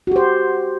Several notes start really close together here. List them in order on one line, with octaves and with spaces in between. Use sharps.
F#4 G4 C5